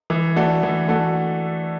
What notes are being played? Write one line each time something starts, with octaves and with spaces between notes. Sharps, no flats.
E3
A3 D4 F#4 A4
E3
A3 D4 F#4 A4